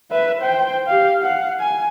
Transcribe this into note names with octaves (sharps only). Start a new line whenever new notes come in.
B4 E5
C5 G5
G4 F5
F5 F#5
G#5